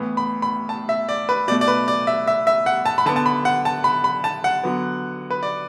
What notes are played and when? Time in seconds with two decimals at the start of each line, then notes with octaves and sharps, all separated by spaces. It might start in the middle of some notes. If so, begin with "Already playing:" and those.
Already playing: A2 E3 B3
0.17 B5
0.42 B5
0.69 A5
0.89 E5
1.09 D5
1.29 B4
1.48 B2 D5
1.51 A3
1.61 D5
1.68 B4
1.88 D5
2.07 E5
2.27 E5
2.47 E5
2.66 F#5
2.86 A5
2.98 B5
3.06 D3 B3 A5
3.16 A5
3.26 B5
3.45 F#5
3.65 A5
3.84 B5
4.04 B5
4.24 A5
4.44 F#5
4.64 D3 F#3 B3
5.30 B4
5.43 D5